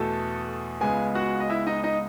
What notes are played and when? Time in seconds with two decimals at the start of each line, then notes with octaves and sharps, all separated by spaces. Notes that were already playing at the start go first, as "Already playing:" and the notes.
Already playing: E2 B2 A3 A4 A5
0.81 C#2 C#3 G#3 B3 G#4 G#5
1.15 F#4 F#5
1.40 D#5
1.50 E4 E5
1.67 D#4 D#5
1.84 D#4 D#5